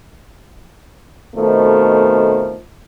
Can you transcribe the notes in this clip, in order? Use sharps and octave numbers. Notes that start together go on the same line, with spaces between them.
F2 B2 D#3 F3 A3